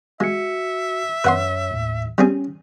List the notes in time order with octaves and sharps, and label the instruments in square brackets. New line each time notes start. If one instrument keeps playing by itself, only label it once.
[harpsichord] G#3 [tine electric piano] F#4 C#7 [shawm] E5
[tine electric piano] F#2 C#5 [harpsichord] B4 F#5 C6
[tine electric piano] D#2 A2
[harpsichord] G3 C4 G#4 [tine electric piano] C#4